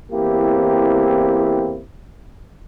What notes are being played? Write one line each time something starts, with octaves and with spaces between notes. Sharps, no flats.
E2 A#3 C4 E4 G4